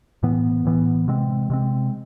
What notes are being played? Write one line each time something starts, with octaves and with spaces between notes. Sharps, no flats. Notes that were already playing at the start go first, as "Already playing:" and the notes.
A2 E3 B3
A2 E3 B3
C3 G#3 C4
C3 G#3 C4